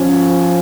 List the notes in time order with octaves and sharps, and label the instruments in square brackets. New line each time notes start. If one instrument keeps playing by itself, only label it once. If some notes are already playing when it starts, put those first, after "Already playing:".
Already playing: [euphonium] F3 [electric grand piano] C#4